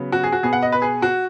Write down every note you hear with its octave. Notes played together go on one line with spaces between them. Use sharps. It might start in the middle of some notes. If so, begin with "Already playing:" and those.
Already playing: C#3 F#3 B3
F#4
G#4
F#4
B2 B3 G#4
F#5
D#5
B4
G#4
F#4